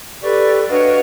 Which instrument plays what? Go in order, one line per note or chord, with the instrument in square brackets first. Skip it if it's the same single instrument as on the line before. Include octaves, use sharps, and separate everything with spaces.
[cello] G4 [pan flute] A4 [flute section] B4 D5 C#6
[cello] D4 C#5 [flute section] F#4 D#5 F5 [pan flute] B4